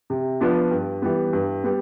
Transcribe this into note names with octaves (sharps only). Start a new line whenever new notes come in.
C3
F3 B3 D4
G2
E3 G3 B3
G2
G3 B3